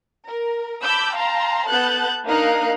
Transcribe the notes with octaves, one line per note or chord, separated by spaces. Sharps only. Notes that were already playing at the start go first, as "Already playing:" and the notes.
A#4
A5 B5 D6 E6 G6
F5 G5 A5 A#5 C6
B3 A4 A5 F#6 G6 A6
A#3 D4 D#4 A#4 F5 F#6